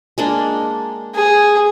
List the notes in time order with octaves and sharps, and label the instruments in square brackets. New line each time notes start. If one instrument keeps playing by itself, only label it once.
[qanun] G#3 A#3 D4
[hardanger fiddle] G#4